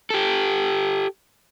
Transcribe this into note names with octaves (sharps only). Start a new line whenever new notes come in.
G4 A4